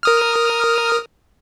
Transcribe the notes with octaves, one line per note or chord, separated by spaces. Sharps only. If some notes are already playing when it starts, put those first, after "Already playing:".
A#4 D#6 F6